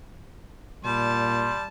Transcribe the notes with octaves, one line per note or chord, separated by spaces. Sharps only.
A#2 G3 A5 C6